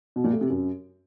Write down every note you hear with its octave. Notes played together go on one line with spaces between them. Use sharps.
B2
A#2
A3
C3
F#2